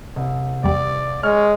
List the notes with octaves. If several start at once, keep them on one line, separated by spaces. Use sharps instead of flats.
C2
E2 G3 D5
G#3 C#5 F6